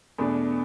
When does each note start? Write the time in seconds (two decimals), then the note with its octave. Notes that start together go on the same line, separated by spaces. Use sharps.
0.18 E2 B2 A3 D4